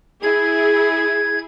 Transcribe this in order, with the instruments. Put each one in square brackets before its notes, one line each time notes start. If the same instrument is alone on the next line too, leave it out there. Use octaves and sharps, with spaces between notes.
[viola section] E4 G#4 [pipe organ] G#6